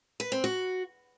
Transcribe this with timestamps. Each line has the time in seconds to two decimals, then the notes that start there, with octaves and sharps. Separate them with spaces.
0.20 B4
0.32 C4
0.44 F#4